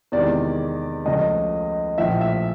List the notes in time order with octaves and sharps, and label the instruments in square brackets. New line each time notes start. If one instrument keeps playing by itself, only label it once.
[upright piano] E2 C3 D#3 G#3 D5
C#2 C#3 F3 A3 D#5
A#1 A2 F3 E5
E5